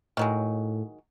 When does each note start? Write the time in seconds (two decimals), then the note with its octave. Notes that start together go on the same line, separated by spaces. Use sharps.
0.17 A2 D#3 F#3 G#3